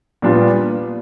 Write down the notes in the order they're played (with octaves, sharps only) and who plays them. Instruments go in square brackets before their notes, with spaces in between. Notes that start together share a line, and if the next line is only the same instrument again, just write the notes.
[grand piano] A#2 G3 B3 D4 F4